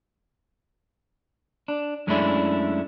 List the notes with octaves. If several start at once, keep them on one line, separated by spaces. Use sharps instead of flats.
D4
F#2 G#3 A3 C#4 D4 E4